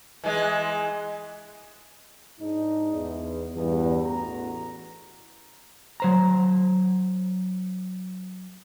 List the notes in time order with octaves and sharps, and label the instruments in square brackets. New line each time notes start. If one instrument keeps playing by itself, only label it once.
[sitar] E3 G#3
[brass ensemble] G#2 D4 D#4
E2
E2 G2
A1 E2 B3 F#4 A#5
[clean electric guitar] F#3 C5 A#5